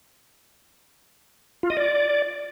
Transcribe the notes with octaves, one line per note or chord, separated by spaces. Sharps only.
F4
D#5
D5